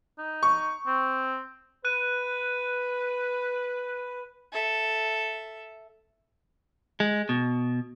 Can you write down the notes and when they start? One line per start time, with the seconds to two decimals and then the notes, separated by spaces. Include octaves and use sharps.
0.18 D#4
0.43 C#6
0.87 C4
1.85 B4 F#6 D#7
4.53 A4 E5
7.00 G#3
7.29 B2